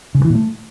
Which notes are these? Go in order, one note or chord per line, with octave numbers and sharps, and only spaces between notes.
C#3
G2
E3
A#2
A3